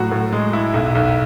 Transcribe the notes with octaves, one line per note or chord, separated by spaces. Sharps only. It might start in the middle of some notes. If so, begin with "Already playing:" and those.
Already playing: A2 F#3 F#4
A2
G#3
E4
B1
B1